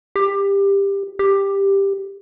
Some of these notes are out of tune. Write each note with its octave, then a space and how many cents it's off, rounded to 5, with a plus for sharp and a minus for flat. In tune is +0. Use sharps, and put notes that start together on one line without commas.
G4 +20
G4 +10